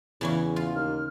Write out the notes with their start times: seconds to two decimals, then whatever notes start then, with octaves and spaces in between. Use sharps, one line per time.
0.21 E2 C#3 E3 C#4
0.56 F4
0.75 D#2 F6